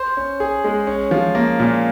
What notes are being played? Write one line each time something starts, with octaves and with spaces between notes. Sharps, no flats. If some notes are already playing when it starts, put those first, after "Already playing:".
Already playing: C5
C#4
G#4
G#3
C#4
F3
A#3
A#2